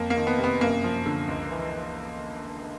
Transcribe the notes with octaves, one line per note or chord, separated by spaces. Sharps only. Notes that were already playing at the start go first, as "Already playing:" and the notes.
Already playing: F2 A#3
A#3
D#3
B3
C3
B3
F#2 A#3
F3
D3
C#2
E3